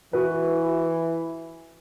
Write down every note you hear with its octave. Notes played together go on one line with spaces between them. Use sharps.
E3 F#4 B4